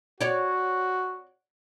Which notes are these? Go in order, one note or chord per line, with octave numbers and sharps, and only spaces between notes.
F#4 C#5 D5